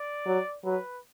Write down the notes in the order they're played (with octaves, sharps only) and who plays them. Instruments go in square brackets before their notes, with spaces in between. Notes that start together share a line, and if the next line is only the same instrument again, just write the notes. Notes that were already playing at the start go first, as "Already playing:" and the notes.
Already playing: [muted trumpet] D5
[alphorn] F#3
[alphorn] F#3 [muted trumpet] B4